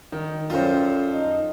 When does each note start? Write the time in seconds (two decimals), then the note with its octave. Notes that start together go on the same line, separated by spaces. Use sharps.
0.12 D#3
0.50 F#2 G3 F4 A4 C5
1.12 D#4